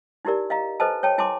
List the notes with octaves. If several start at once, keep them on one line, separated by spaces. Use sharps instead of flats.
D#4 E4 G4 A#4 D5
D#5 F5 A#5
A4 B4 C5 D#5 G#5 A5
C#5 G5 A5
E4 G#5 A5 C6 D6